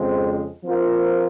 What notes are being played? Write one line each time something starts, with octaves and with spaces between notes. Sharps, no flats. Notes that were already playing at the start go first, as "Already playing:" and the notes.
Already playing: F2 C#3 F3 G#3 C4
F3 C4 F4 A#4